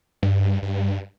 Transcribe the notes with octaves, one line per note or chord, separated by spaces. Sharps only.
G2
G2